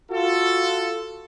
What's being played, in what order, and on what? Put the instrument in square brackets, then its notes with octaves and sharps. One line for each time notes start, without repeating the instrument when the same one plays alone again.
[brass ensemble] F4 F#4 A4